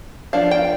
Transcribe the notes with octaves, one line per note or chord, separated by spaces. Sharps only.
F3 B3 D4 F5
G5